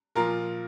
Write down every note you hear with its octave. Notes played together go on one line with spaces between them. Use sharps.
A#2 F3 F4 A#4